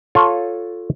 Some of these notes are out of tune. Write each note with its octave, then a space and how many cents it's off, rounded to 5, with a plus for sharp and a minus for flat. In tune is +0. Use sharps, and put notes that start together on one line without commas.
F4 +10 A4 +0 C#5 +0